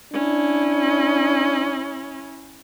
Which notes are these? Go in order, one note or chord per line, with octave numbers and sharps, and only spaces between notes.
C#4 D4 E4